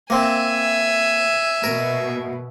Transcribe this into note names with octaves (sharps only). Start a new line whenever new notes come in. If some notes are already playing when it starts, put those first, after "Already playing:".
A#3 C4 E5 G#5
B2 A#4